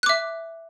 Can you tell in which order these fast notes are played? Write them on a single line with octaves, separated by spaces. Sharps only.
F#6 D6 E5